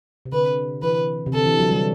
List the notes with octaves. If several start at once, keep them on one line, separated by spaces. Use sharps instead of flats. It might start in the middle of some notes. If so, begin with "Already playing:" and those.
C3
D3 B4
E3 B4
C3
D3 A4
E3
F#3
G3